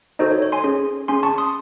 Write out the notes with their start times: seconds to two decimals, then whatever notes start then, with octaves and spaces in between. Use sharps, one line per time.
0.19 D#4 F#4 A4 C5 D#5
0.31 C#5
0.42 C#5
0.52 G#5 C6
0.64 C#4 G#4
1.08 C#4 G#4 G#5 C6
1.23 A5 C#6
1.38 C6 D#6